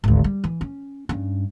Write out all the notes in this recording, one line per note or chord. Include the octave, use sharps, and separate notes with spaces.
G#1 D2
G3
E3
C#4
G2 C#4